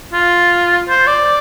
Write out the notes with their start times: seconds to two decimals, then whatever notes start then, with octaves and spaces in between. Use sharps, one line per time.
0.13 F4
0.88 C5
1.07 D5